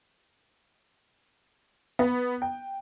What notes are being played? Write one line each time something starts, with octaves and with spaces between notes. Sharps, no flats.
B3
G5